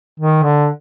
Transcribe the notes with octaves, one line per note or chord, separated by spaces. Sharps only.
D#3
D3